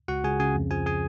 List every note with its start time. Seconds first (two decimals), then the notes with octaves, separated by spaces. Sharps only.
0.08 C#2 F#4 F#5
0.24 C#2 G#4 G#5
0.39 C#3 G#4 G#5
0.55 F2
0.71 F3 G#4 G#5
0.86 G#4 G#5